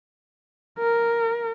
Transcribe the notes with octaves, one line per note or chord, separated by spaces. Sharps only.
A#4